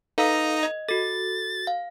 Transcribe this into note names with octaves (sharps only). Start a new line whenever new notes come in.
D#4 A4 B4 F5 A#5 D#6
D#5
F#4 A4 A6
F5